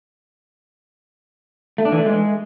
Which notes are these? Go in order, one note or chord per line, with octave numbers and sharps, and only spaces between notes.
A3
D4
E3
A3
G#3